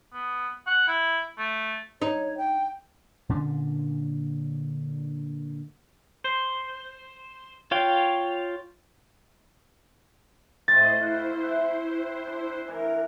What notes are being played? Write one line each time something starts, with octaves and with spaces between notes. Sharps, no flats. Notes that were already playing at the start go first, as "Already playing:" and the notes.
B3
F#5
E4
A3
D#4 C#5
G5
A#2 D3 C#4 D4
C5
F4 C#5 F5 G5
A2 A3 C4 F4 C5 D#5 A6
E4 C5 D#5 F5 F#5
E5 F#5
D4
E3 D4 A#4 G#5